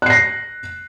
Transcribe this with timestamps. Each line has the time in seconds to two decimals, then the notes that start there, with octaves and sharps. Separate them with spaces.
0.02 F#6
0.06 C7
0.10 A#6